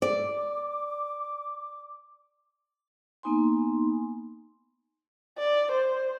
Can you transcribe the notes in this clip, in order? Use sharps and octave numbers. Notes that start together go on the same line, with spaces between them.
D5 D6
A#3 B3 D#4 G#5 C6
D5
C5